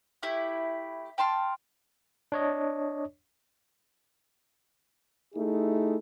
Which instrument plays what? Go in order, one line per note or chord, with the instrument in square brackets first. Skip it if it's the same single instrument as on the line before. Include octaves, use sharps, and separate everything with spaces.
[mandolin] A3 E4 G4
G5 A5 C6 F6
[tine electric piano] D4 C#5 D#5
[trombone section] A3 D#4 E4 G4 G#4